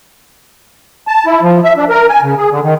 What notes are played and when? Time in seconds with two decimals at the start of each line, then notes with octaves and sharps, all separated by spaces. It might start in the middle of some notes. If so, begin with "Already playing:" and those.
1.08 A5
1.26 E4
1.42 F3
1.64 E5
1.77 D4
1.89 A#4
2.09 G#5
2.22 C#3
2.38 G#4
2.51 D3
2.64 D#3